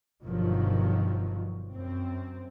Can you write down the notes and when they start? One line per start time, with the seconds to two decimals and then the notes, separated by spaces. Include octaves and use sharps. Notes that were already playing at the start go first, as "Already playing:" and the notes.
0.23 G1 B2 D#3 F3 F#3
1.74 F#2 C4